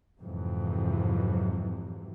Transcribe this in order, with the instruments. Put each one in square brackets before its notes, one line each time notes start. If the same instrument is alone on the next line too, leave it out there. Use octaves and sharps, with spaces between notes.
[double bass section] F2 G#2 C3 E3 F#3